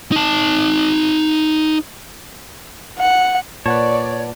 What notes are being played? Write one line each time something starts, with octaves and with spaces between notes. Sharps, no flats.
D#4 A5
F#5
A#2 B4 C#5 D5 F#5 A5